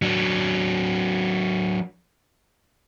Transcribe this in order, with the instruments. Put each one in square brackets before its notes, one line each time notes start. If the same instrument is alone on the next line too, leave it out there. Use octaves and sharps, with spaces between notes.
[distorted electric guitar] F#3 D4